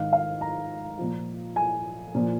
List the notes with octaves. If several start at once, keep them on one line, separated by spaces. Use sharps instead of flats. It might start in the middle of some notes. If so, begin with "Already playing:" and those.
Already playing: G#2 D#3 F5
F5
A#5
A#2 F3
G#5
A#2 F3